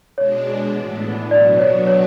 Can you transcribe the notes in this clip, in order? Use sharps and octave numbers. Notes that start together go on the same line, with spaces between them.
B2 G#3 D4 C#5
A2 E3 B3 D4
B2 F#3 B3 D4 F#4 D5
C#5
C#5